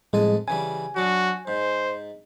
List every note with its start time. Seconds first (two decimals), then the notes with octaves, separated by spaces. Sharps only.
0.13 F2 A2 G3 G#3 A4 G#5
0.48 C#3 E3 G3 G#5
0.96 F#3 D4 F#4
1.47 G#2 C5